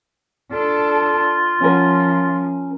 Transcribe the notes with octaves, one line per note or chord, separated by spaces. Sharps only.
D4 F4 A4
F3 C#4 A#4